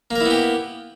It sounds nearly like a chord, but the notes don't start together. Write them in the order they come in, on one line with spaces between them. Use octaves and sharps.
A#3 A#4 E4 B3 G4